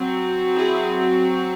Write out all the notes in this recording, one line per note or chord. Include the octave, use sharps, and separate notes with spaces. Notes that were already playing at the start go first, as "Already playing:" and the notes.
Already playing: F#3 C4
E4 G#4